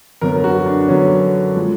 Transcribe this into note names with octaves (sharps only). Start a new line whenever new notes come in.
F#2 D3 F#3 B3 A#4
F#4
D4
F#2 D3 F#3 B3 C#4
F3 G#3